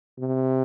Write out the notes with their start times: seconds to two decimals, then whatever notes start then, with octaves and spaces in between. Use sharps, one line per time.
0.20 C3